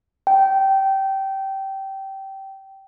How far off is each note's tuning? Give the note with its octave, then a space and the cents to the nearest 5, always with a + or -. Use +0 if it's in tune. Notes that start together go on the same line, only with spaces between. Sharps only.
G5 -20